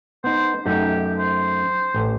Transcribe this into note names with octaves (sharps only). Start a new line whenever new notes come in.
B3 D#4 C5
F#2 A3 D#4 G4
C5
A1